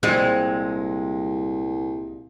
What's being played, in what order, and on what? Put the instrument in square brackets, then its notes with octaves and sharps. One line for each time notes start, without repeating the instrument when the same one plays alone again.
[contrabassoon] C2 [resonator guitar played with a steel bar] A#2 G#3 [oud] G3 C4